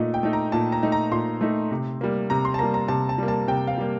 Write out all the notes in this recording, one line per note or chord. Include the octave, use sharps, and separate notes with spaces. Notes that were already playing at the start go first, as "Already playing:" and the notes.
Already playing: A#2 A3 D#4 D#5
G5
A3 D#4
A#5
A#2 A5
A#5
A3 D#4
A#5
A#2 C6
A3 D#4
C3
G3 A#3
C3 A#5
C6
A5
G3 A#3 A#5
A#5
C3 A5
A5
G3 A#3
A5
C3 G5
F5
G3 A#3